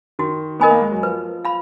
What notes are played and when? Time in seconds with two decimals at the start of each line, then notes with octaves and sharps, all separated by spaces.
0.19 D#3 F#4
0.60 B3 A#4 D#5 G#5 B5
0.70 A#3
0.81 G#3
0.92 F#3
1.02 F3 B4
1.45 F5 B5